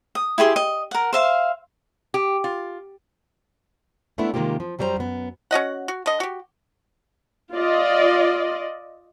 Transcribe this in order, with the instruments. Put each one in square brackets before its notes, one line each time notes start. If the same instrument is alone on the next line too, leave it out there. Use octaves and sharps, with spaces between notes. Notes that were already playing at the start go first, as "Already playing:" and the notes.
[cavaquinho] D#6
E4 G4 G#4 C6
D#5
A#4 F#5
C5 E5 F5
[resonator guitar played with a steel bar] G4
F4
[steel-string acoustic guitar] G#3 A3 B3 D4 E4
C3 D#3 G#3 A#3 F4 G4
F3
F#2 F#3 G3 F#4 C5 A#5
F#2 B3
[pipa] C#4 F#4 D#5 F#5
F#4
D3 D#5
F#4 G4
[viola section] F4 D5 D#5